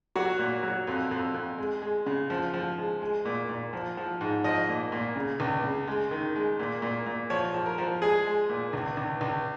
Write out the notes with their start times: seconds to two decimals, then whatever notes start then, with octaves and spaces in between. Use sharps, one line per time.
0.16 F#3 F#4
0.39 A#2
0.63 F#3
0.87 F2
1.11 F2
1.34 F2
1.58 G#3
1.82 G#3
2.06 C#3
2.30 F3
2.53 F3
2.78 G#3
3.02 G#3
3.25 A#2
3.49 A#2
3.73 F3
3.97 F3
4.21 G#2
4.44 F3 D#5
4.69 A#2
4.92 A#2
5.16 C#3
5.40 C#2
5.63 C#3
5.87 G#3
6.11 D#3
6.36 G#3
6.59 A#2
6.82 A#2
7.06 A#2
7.30 F3 C#5
7.54 F3
7.66 A#4
7.78 F3
8.02 G#3 G#4
8.26 G#3
8.49 A#2
8.73 C#2
8.97 C#2
9.21 C#2